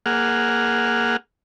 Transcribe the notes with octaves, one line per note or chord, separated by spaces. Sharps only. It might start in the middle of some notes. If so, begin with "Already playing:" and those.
A#3 G#4 F#5 F6